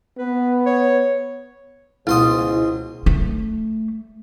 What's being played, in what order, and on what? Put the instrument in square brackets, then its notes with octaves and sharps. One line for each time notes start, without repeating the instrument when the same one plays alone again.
[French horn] B3 [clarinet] B4
[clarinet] C#5
[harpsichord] C#2 C6 D#6 [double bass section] B2 [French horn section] G#3 C5 [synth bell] E4
[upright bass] A3